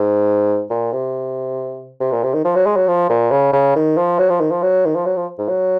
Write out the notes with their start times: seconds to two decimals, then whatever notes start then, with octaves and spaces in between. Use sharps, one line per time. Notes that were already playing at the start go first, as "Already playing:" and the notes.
Already playing: G#2
0.70 A#2
0.93 C3
2.01 C3
2.12 A#2
2.23 C3
2.34 D#3
2.45 F3
2.55 F#3
2.66 G#3
2.77 F#3
2.88 F3
3.10 A#2
3.31 C#3
3.53 C#3
3.76 D#3
3.97 F3
4.18 F#3
4.29 F3
4.40 D#3
4.51 F3
4.62 F#3
4.85 D#3
4.96 F3
5.06 F#3
5.17 F3
5.38 G#2
5.49 F#3